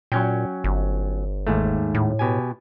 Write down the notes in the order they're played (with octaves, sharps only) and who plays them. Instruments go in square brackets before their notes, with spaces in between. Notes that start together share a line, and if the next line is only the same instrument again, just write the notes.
[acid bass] A#2 [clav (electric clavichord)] F#3 C#4 G5
[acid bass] G1
[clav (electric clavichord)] D#2 G#2 A3
[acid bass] A2
[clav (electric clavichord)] B2 G4 G#5